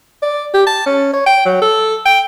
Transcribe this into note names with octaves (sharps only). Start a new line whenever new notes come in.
D5
G4
A5
C#4
C#5
G5
F#3
A4
G5